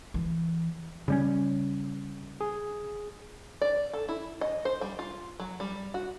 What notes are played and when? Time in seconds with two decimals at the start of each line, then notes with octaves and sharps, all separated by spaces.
0.14 E3
1.08 C#3 G3 C#4
2.41 G#4
3.61 D5
3.93 A4
4.09 E4
4.41 D#5
4.65 C5
4.81 G3
4.99 F4
5.40 F#3
5.60 G3
5.94 F#4